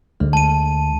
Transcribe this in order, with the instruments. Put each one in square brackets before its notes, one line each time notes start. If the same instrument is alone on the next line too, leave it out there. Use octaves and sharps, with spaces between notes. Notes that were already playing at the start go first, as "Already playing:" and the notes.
[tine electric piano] D2 D3 G#3
[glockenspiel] A5 D#7